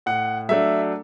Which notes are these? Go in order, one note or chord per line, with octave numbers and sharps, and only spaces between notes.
A2 F#5
F#3 A3 D4 E5